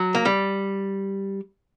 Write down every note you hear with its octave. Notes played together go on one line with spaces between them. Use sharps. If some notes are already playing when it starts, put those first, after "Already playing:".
Already playing: F#3
A#3
G3